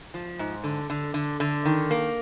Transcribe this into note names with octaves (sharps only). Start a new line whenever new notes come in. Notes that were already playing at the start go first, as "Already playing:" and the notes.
F3
G#2
D3
D3
D3
D3
D#3
A#3